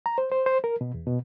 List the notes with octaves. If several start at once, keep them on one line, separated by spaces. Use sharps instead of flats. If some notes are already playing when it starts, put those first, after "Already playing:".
A#5
C5
C5
C5
A#4
B2
E2
B2